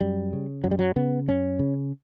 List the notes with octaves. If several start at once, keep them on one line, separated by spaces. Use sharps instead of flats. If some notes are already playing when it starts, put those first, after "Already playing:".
F#2 G3
C#3
F#2 F#3
G3
F#3
C#3 B3
F#2 C#4
C#3